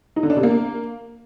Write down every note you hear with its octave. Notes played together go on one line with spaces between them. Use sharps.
D#4
D3
D4
C3
A#3